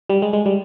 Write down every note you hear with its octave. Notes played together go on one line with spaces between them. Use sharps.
G3
G#3
G#3
G3